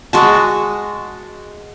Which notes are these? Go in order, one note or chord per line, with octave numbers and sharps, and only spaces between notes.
G#3 F#4 A5